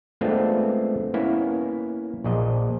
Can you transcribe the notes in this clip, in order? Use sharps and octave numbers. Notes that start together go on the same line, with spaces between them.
G#3 A3 B3 C4 D4 F4
A#3 B3 C#4 E4
A#1 A#2 D#5